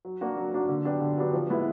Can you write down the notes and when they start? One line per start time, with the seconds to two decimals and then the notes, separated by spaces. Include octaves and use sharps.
0.05 F#3
0.21 A#3 D4 F#4
0.37 F#3
0.53 A#3 D4 F#4
0.69 D3
0.85 F#3 B3 D4 G4
1.02 D3
1.18 F#3 B3 D4 G4
1.33 F3
1.50 G#3 B3 E4